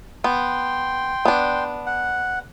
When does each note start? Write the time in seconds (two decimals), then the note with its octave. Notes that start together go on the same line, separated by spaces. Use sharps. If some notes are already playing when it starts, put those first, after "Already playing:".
0.24 B3 G5 C6
1.25 B3 D4
1.86 F#5